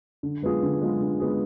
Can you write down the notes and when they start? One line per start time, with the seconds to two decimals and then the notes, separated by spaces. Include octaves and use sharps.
0.23 D3
0.42 G#3 B3 F4 G#4
0.63 D3
0.81 G#3 B3 F4 G#4
1.00 D3
1.20 G#3 B3 F4 G#4